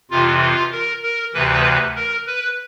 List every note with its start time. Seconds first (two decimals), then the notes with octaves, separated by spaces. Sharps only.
0.10 F2 C3 E3 F4
0.41 F4
0.71 A#4
1.02 A#4
1.33 D2 C3 E3 B4
1.95 A#4
2.26 B4